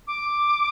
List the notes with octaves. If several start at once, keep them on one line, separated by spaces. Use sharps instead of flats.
D6